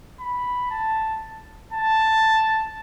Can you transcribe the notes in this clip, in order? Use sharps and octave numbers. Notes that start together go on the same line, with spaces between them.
B5
A5
A5